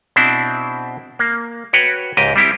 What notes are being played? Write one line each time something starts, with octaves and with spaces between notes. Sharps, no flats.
B2 C4 D4 E4 C5
A#3
F#4 B4 C#5 G5
C#2 G#2 G4 D#5
G3 C4 E4 G4